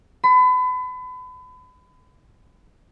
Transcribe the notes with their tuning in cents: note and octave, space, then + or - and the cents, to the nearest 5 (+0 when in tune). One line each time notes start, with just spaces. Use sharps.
B5 +35